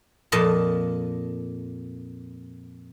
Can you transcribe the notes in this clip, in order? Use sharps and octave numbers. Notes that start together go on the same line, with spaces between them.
F2 A#2 D#5 A5